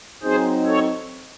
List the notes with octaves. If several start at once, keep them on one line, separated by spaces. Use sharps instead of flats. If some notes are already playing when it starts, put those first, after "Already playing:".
F#3 C4 D#4 G#4 C5
A4 C#5